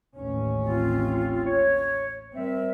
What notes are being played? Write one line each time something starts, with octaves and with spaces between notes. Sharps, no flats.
A1 D#2 C#4
C4 F4
C#5
G3 C4 A#4 E5